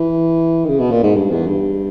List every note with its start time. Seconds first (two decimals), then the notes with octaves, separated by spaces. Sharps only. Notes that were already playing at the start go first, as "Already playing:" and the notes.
Already playing: E3
0.65 D#3
0.68 C#3
0.80 B2
0.91 A#2
1.03 G#2
1.15 G2
1.31 E2
1.47 G2